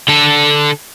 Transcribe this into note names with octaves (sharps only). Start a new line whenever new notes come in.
D3 A4